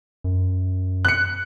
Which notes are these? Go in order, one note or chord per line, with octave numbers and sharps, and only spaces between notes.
F#2
F#6 C#7